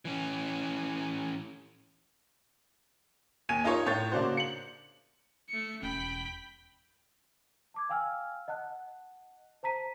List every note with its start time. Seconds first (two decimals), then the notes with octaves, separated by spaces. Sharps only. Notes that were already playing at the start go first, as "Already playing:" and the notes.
0.05 E3 C#4
3.49 D#2 G#5 G#6 D#7
3.64 D#4 F4 A#4 C#5
3.86 A2 C#5 G6 A6
4.12 C#3 A#3 D4 F#4 C5
4.37 C#7 F#7
5.49 A3 C#7
5.82 E1 C#4 G5 B5
7.74 A5 D6 G#6
7.89 F5 G5 G#5 E6 F6
8.48 D#5 F#5 A5 F#6
9.63 C5 A5 A#5 B6 D#7